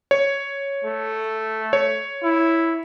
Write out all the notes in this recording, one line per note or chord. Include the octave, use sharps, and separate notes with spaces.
C#5
A3
C#5
E4